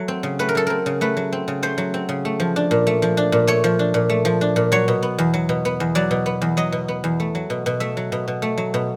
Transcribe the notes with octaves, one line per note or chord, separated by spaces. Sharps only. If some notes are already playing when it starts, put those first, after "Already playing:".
Already playing: F#3 A3
C4
C#3
A3 B4
A#4
F#3 A4
C4 A#4
C#3
A3 B4
F#3
C4
C#3
A3 C5
F#3
C4
C#3
A3
F3
D4
A#2
A3
F3
D4
A#2
A3 C#5
F3
D4
A#2
A3
F3
D4
A#2
F#3 C#5
B2
B3
E2
F#3
B2
B3
E2
F#3 D5
B2
B3
E2
F#3 D#5
B2
B3
E2
A3
F#3
B2
B2
A3 E5
F#3
B2
B2
A3
F#3
B2